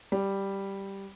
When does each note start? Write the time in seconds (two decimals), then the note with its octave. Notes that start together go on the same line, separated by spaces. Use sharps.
0.12 G3